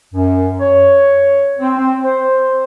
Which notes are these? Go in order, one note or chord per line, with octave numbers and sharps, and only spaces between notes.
F#2
C#5
C4
C4
C5